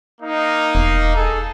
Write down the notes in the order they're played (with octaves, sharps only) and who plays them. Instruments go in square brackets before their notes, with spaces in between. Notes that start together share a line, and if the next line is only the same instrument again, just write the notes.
[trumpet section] A#3 D#4
[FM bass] E1
[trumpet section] G#4 A4